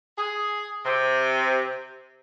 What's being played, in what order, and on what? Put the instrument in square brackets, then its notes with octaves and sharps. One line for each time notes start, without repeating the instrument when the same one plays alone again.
[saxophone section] G#4
C3